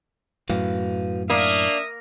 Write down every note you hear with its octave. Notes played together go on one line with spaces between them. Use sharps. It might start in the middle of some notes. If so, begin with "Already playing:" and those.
F#2 A2 F#4 B4 F5
A#3 D4 E5 F5 D#6